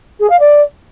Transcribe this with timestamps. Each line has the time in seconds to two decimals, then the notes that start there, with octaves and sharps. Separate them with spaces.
0.19 G#4
0.29 F5
0.39 D5